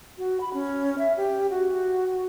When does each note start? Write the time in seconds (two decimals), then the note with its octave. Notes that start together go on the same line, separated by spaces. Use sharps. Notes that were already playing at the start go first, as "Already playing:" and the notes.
0.18 F#4
0.41 B5
0.53 C#4
0.98 E5
1.17 G4
1.50 F#4